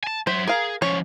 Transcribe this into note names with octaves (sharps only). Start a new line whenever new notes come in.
G#5 A5
F#3 C5 E5
G#4 A#4 F5
F3 C#4 C#5